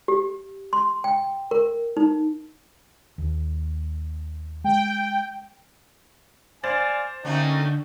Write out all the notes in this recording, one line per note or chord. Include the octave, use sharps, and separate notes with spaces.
G4
C6
G5
A#4
D#4
D#2
G#3 G5
C5 D5 F5 G#5 A6 F#7
D3 A3 A#3 C#4 D#4 F#4 G5